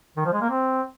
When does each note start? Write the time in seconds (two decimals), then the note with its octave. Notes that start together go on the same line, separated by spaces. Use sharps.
0.17 D#3
0.25 F3
0.33 G#3
0.41 A#3
0.50 C4